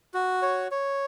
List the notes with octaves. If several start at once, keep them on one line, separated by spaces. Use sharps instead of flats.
F#4
C#5
C#5